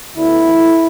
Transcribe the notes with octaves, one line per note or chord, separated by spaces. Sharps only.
D2 D3 B3 E4
A2 E3 A3